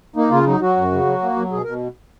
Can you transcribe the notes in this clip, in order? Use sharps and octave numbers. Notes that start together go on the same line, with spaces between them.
A#3 D#4
C#3 F4
F#3 D#4
F#3 F#4
F#2
C#3
F#3
A#3
F#3
B2 G#4
B2 A#4